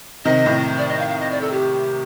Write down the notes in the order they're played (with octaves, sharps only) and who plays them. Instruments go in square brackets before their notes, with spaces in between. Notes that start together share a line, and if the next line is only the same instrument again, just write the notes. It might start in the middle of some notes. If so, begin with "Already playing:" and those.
[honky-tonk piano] C3 D#3 [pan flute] D#5
[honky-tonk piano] A2 C3
[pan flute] D5
D#5
F5
F5
D#5
D5
A4
G4